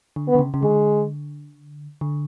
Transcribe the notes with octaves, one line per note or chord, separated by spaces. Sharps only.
D3
B3
D3
C#3
C#3
D3 G#3
D3